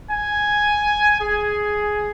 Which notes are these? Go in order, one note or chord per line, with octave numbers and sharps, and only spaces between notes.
G#5
G#4